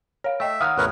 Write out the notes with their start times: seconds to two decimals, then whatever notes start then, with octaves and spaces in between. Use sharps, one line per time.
0.24 A#4 C#5 F5
0.40 A3 D#5 E5 G5 E6
0.61 D#3 C#5 F5 F#5 A#5 D#6 F6 F#6
0.78 A1 E2 A2 A#4 B4 C#5